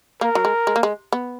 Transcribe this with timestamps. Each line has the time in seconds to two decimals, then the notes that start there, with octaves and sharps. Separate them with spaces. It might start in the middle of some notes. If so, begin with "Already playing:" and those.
0.21 A#3 A#4
0.35 F#3
0.45 G#3
0.67 G#3
0.76 A#3
0.83 G#3
1.12 B3